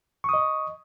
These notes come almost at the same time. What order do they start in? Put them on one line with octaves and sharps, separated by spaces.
C#6 D#6 D#5